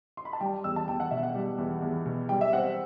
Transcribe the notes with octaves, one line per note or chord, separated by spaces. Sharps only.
C6
B5
A5
G3 G5
E2 E6
A5
E2 G5
F#5
B2 E5
F#5
G3
E2
E2
B2
G3 G5
E5
C4 F#5